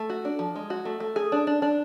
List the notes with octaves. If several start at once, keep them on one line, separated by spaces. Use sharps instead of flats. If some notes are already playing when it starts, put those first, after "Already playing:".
Already playing: A3
F#4
D4
F3
G#3
F#4
A3
A3
G#4
D4
D4
D4